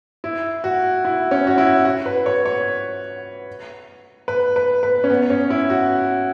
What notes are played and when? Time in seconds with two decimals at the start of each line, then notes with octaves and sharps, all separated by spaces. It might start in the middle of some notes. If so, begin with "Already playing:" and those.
0.24 E4
0.64 F#4
1.05 E4
1.31 C#4
1.47 F#4
1.58 E4
1.85 F#4
2.06 B4
2.26 C#5
2.46 C#5
4.28 B4
4.56 B4
4.83 B4
5.04 C#4
5.10 B3
5.30 C#4
5.50 E4
5.70 F#4